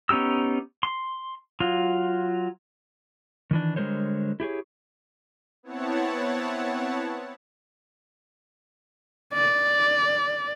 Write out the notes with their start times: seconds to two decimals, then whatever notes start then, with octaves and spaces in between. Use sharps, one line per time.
0.09 B3 C#4 D#4 G4 E6
0.83 C6
1.60 F#3 F4
3.51 D#3 E3 D4
3.76 D3 G3 G#3 A#4 C5 C#5
4.40 E4 G4 G#4 C#5
5.63 B3 C4 E4 C#5 F#5 A5
9.34 D5